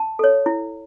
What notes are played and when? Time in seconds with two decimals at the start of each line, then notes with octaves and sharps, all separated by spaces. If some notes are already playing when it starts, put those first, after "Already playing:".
Already playing: A5
0.19 A4 C#5
0.46 E4